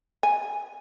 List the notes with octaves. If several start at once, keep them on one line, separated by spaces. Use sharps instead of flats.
G#5